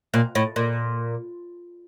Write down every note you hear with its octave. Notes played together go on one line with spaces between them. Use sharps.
A#2
A2
A#2